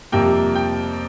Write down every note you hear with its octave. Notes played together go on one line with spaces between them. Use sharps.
F2 C3 G3 A#3 G5
G5